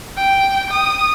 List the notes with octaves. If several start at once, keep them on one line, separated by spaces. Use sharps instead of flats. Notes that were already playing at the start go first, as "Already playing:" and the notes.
G5
D#6